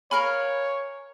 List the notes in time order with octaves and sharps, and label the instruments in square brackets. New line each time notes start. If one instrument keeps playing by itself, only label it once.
[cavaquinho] A#4 F5 G#5 [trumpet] C#5 [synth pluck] B5